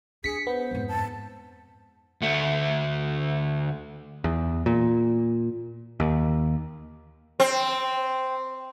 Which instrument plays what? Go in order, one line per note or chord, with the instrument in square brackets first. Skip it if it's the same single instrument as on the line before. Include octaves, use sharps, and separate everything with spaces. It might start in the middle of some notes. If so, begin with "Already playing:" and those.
[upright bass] D4 [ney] G#4 [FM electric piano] B6 C#7
[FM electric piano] B3 [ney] C5
[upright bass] F2 G#2
[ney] A5
[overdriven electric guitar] D2 A3
[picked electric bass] E2
A#2
D#2
[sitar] C4